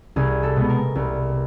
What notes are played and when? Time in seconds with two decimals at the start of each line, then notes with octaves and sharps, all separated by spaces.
0.16 C2 G#4
0.43 A4
0.56 B2 G#3 B3
0.69 A#4
0.95 C2